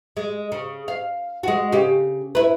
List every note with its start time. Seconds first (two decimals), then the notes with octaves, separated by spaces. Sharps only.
0.17 G#3
0.52 C#3
0.88 F5
1.43 G#3 F#4
1.72 C#3 G4
2.35 E4 B4